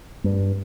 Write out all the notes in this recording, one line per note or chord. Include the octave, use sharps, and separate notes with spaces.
G2